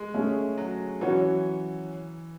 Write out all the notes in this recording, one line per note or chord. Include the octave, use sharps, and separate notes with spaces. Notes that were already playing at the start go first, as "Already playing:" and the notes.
Already playing: G#3
A3 C#4 G#4
F#3
E3 F#3 C#4 F#4 C#5